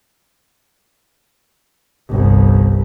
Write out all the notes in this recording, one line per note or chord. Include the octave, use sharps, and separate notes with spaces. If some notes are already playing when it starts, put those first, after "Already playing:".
G1 C2